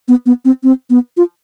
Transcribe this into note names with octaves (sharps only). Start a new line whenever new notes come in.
B3
B3
C4
C4
B3
F4